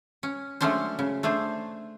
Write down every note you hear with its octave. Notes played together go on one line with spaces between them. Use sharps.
C#4
F#3 G#3 A3 C#4 D4 C5
C#3
A3 D4 G#4 C5